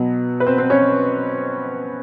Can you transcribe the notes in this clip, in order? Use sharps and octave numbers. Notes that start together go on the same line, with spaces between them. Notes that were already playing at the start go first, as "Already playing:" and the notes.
Already playing: B2 F#3 B3
B4
C4 C5
C4 C5
C#4 C#5